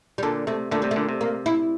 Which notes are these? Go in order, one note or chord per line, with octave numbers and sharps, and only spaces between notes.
G3
A#2 D3 A3
C3 A3
A#2 D3 A3
C3 G3
A3
A#2 D3
C3
A#3
E4